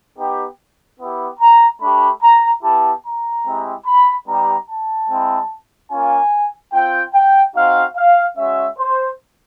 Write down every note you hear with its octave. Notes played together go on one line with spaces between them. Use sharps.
B3 D#4 G4
B3 E4 G4
A#5
A3 D4 G4 B5
A#5
B3 E4 G4 A5
A#5
G#3 C4 E4 G4
B5
G3 B3 D#4 G4 A#5
A5
G#3 C4 E4
A#3 C#4 F4 G#5
C4 F4 G5
G5
C4 D#4 F#4 F5
F5
G#3 C#4 F#4 E5
C5